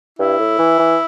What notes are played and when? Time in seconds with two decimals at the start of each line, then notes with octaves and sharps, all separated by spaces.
0.19 G2 E4
0.39 A2
0.59 E3
0.79 E3